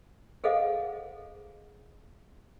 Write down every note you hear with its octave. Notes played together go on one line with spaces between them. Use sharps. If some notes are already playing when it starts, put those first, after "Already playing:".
G#4 A4 C5 D#5 F5 F#5